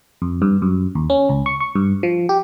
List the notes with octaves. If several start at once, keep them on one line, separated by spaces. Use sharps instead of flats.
F2
G2
F#2
D#2
C#4
C#2
C#6
C#6
G2
F3
G4